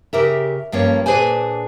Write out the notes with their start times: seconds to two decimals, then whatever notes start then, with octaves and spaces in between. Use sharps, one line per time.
0.13 C#3 G4 A#4 E5
0.72 G2 F3 A#3 C#4 C#5
1.06 A#2 D4 G#4 B4 C5 G#5